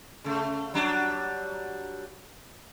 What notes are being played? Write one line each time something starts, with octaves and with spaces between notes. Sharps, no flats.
C#3 A3
F#3 G3 D4